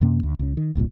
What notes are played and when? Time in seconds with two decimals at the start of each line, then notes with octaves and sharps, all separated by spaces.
0.01 F#2 C3 A#3 C#4
0.23 D2
0.39 C#2 C#3
0.57 D#3
0.75 D#1 C2 G2 A#2